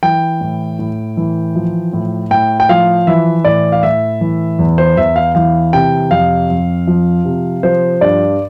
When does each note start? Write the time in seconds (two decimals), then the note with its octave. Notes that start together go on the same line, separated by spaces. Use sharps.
0.03 E3 G5
0.41 A2
0.79 A2
1.17 E3
1.56 F3
1.93 A2
2.31 A2 G5
2.60 G5
2.69 F3 F5
3.07 E3 E5
3.45 A2 D5
3.72 F5
3.83 A2 E5
4.21 E3
4.59 E2
4.78 C5
4.97 E2 E5
5.16 F5
5.35 E3 F5
5.73 C3 G5
6.11 F2 F5
6.50 F2
6.87 F3
7.25 C3
7.63 F3 C5
8.01 G2 D5